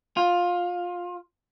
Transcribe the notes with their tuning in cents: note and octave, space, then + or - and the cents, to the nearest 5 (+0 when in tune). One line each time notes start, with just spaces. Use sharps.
F4 +15